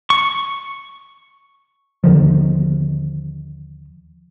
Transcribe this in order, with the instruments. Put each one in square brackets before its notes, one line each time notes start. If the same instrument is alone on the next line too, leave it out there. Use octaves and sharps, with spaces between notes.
[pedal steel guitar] C#6
[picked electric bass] D#2 D3 D#3 F3